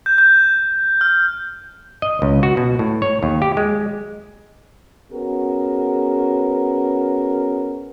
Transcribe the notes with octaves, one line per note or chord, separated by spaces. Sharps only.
G6
G6
F6
D#5
C#2
F#4
B2
A2
C#5
D#2
G4
G#3
B3 C#4 F#4 G#4 A#4